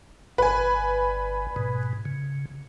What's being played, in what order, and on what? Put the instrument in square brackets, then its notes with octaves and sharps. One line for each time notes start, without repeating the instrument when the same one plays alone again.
[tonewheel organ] G1 [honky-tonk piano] B4 G#5
[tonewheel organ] G#2 B2
C#3